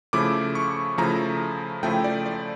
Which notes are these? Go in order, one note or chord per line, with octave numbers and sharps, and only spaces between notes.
C#3 F3 A3 E4 D6
C#6
C#3 F3 A3 E4 A#5
C#3 F3 A3 E4 G5
D5
D5